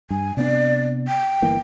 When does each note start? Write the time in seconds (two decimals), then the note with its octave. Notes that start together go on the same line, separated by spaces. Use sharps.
0.10 G2 G#5
0.37 C3 B3 D4 D5
1.08 G5
1.42 G1 E3 A#3